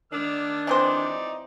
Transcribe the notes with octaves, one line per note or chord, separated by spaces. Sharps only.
D#3 D4 D6 E6 F6
E3 C4 D#4 C5 D5